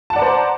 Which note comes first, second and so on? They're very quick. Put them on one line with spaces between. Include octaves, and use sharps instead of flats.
A5 F#5 D5 A#5 C5